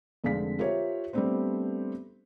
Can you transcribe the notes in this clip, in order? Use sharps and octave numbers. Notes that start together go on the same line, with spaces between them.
F1 D3 G#3 C4 F5 B6
F4 G4 A#4 C5 C#5 E5
G3 A3 B3 C4 D4 C5